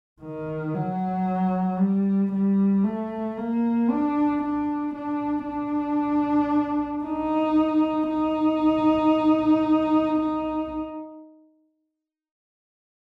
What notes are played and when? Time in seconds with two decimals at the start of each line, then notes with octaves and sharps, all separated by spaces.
0.22 D#3
0.74 F#3
1.80 G3
2.33 G3
2.84 A3
3.37 A#3
3.90 D4
4.43 D4
4.95 D4
5.47 D4
7.05 D#4
8.10 D#4
10.19 D#4